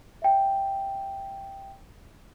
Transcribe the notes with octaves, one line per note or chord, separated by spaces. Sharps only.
E5 G5